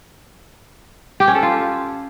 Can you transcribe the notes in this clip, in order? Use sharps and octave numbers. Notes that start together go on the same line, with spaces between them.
G4
C#4
A4
F4